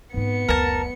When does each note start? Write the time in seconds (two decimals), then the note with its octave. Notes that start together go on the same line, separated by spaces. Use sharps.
0.14 G#2 B3 C4 C#7
0.49 F#1 D2 A#4 A5